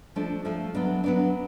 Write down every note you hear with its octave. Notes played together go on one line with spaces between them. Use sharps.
F3 A3 D4
F3 A3 D4
F#3 B3 D4
F#3 B3 D4